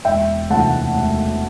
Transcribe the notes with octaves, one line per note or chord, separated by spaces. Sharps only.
E1 E5 G5
D2 C3 E3 F#5 A5
E1